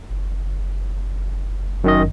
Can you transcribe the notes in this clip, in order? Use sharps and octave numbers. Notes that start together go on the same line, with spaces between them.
F#1
F#2 D#3 D#5